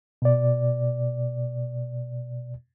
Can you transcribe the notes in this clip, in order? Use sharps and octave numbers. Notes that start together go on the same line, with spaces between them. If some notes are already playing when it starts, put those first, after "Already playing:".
B2 D5